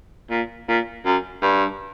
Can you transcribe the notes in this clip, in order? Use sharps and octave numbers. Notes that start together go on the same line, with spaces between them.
A#2
A#2
F#2
G2